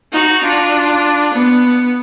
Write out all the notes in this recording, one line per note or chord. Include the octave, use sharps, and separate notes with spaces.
D#4 F#4
D4 F4
B3